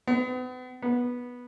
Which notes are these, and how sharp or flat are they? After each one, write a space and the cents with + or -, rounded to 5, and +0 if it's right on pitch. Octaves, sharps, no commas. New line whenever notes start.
B3 +40
B3 -10